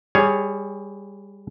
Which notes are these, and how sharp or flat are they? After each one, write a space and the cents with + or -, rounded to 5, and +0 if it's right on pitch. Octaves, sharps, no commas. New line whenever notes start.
G3 +20 G#4 +0 C#5 +0